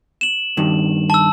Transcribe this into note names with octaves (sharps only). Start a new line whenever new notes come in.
E7 F#7
G2 D#3
A5 E6